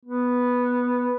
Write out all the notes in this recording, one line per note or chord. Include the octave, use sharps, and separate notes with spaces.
B3